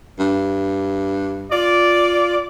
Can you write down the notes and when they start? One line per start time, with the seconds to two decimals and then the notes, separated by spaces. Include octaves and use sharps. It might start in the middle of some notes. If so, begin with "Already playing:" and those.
0.19 G2
1.51 F4 D5